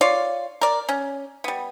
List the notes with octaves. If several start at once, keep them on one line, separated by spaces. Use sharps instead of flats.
F4 C#5 D5
A#4 D5
C#4
G3 B3